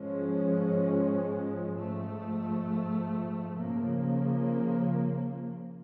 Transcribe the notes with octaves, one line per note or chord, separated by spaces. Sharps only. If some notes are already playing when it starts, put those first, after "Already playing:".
Already playing: G#2 F3 G#3 C#4
G#2 F3 A3
C#3 F3 A#3